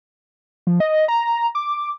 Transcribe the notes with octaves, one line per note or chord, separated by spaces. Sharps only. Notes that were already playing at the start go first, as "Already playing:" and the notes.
F3
D#5
A#5
D6